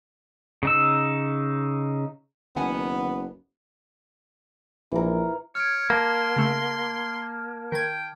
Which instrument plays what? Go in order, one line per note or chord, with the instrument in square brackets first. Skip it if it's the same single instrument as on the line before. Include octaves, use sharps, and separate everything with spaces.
[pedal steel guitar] C#3 D#4 E6
[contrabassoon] F#1 [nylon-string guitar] D#3 F#5 G#5 [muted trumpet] B3
[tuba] A#1 [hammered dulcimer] E3 A#4
[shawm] C#5 [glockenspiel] F6 G#6 D7
[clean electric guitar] A#3 [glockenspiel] A5 D6 [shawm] C6
[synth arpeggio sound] C#3 A3
[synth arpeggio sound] D#3 G#6 [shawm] G5